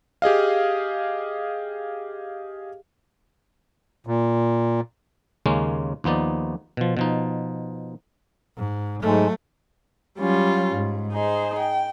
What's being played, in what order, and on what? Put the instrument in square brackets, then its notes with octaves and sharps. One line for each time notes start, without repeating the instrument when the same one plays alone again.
[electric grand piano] G4 G#4 D#5 F5
[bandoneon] A#2
[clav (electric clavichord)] D#2 C#3 G#3 A#3 C#4
D#2 F3 B3 D#4 D5
B2 F3
B2 F3 D#4
[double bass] G#2
[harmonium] G#2 [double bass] F#3 A3
[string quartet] F#3 G3 C#4 F4
G#2
D#4 G#4 C5
G5